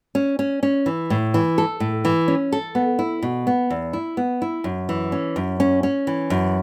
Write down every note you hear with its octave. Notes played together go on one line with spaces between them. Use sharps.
C#4
C#4
C#4
E3
A2
E3
A4
A2
E3
C#4
A4
B3
E4
B2
B3
E2
E4
B3
E4
F#2
E3
C#4
F#2
C#4
C#4
E3
F#2